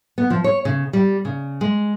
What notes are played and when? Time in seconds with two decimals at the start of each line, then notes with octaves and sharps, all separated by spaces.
0.18 B3
0.30 F3
0.44 C#5
0.65 C#3
0.93 G3
1.25 C#3
1.61 G#3